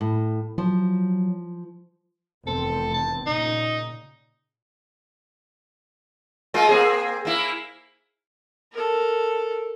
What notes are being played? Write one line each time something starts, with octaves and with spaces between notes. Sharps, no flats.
A2
F3 F#3
F1 E2 C4 A4
A5
A#2 C#3 D#4
G#3 A#3 F4
A#3 C4 G#4
A#3 E4
A4 A#4